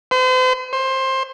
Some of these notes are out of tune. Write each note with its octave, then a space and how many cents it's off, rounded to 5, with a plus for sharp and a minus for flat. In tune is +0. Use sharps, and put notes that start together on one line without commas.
C5 -40
C5 +20